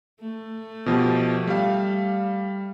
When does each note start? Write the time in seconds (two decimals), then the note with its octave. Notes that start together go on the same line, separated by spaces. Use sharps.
0.20 A3
0.86 B2 F3 G4
1.47 G3 F5